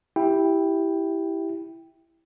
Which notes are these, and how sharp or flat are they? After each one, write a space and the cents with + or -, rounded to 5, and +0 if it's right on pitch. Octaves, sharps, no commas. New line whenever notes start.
E4 -5 G4 +0 G5 +5